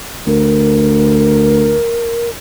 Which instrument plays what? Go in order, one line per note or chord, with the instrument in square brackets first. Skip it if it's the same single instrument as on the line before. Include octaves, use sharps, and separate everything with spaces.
[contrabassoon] D2 [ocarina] A#4